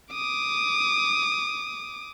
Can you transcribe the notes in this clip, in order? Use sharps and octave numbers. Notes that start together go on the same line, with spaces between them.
D6 D#6